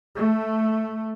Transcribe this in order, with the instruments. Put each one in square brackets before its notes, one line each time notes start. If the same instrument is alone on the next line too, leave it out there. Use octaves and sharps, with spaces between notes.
[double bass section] A3